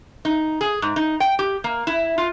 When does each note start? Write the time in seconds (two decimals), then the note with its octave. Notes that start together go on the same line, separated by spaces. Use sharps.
0.25 D#4
0.61 G#4
0.82 G#2
0.96 D#4
1.20 G5
1.39 G4
1.64 A#3
1.87 E4
2.18 F4